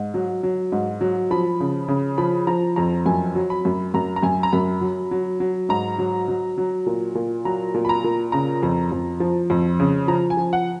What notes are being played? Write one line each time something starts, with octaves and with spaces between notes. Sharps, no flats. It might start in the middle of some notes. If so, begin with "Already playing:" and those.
Already playing: G#2
F#3
F#3
G#2
F#3
F3 B5
C#3
C#3
F3 B5
F3 A#5
F2 A#5
F#2 G#5
F#3
B5
F#2
F#2 A#5
A#5
F#2 G#5
A#5
F#2 B5
F#3
F#3
F#3
G#2 A#5
F#3
F#3
F#3
A#2
A#2
F#3 A#5
A#2
B5
A#5
A#2
C#3 A#5
F2
F2
F3
F2
C#3
F3 A#5
G#5
F3
F#5